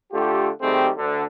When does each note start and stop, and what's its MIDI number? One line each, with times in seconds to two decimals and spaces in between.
0.12 0.48 50
0.12 0.48 57
0.12 0.48 65
0.12 0.48 67
0.61 0.89 51
0.61 0.89 55
0.61 0.89 57
0.61 0.89 60
0.61 0.89 67
0.61 0.89 68
0.97 1.23 38
0.97 1.23 50